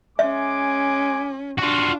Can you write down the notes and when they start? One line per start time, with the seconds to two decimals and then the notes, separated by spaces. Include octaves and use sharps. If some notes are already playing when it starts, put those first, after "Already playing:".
0.19 G#3 C#4 E5 G#5 D6
1.59 D4 F4 F#4